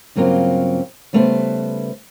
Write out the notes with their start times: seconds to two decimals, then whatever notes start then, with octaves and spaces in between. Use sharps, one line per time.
0.16 G2 C#3 F#3 A#3 C4 F4
1.13 C#3 G3 A3 B3 B4 C5